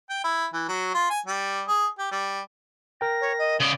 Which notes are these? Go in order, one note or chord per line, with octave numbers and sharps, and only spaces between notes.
G5
E4
E3
F#3
F4
G#5
G3
G#4
G4
G3
A#4 G5 A#6
C#5
D#5
C#3 D5 D#6